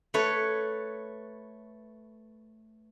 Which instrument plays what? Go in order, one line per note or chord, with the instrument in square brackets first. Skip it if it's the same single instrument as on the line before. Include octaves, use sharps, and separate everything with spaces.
[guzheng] A3 B4 C#5